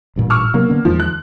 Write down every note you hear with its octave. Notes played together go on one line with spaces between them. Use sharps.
A1 G2 A#2
C#6 E6 F6
C3 F#3 A#3 B3
D3 B3 C#4
E2 D#3 F3 G#3
F#6